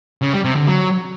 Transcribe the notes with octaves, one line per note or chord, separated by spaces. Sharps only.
C#3
G3
C3
D3
F#3